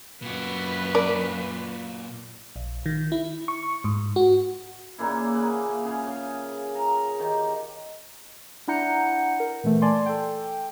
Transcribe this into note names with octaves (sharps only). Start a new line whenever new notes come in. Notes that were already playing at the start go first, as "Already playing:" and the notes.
F#2 A#2 F#4 B4
A#4 D5
A#1
D#3
E4
C#6
G#2
F#4
A#2 C#3 A#3 E4
A#3 G#4 F#5
C#3 G#4 F5
C#3
A#5
D#3 G4
D4 E4 F#5 A#5 G6 C#7
A#4
A#2 E3 A3
D5 G#5 A5 C6
A4 G5